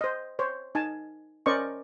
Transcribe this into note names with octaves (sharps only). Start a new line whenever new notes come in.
C5 D#5
C5 C#5
D#4 G#5 A5
C#4 A#4 C5 D5 D#5 C#6